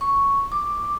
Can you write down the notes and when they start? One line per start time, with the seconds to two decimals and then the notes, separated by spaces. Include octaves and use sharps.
0.01 C#6
0.52 D6